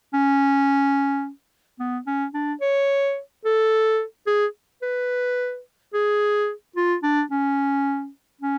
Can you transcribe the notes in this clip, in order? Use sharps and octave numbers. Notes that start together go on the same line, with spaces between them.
C#4
B3
C#4
D4
C#5
A4
G#4
B4
G#4
F4
D4
C#4
C#4